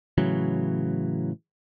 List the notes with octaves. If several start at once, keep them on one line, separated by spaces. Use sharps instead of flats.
A2 C#3 E3 F#3